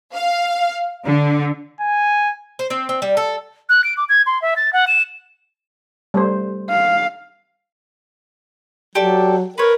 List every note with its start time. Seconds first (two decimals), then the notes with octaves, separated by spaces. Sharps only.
0.13 F5
1.05 D3
1.81 G#5
2.59 C5
2.70 C4
2.89 C4
3.02 G3
3.17 A4
3.69 F#6
3.84 D7
3.97 D6
4.09 G#6
4.26 C6
4.42 E5
4.56 A6
4.73 F#5
4.87 E7
6.14 G3 A3 C5
6.70 F5
8.95 F#3 G4 A4 D5
9.58 A#4 B4 C#5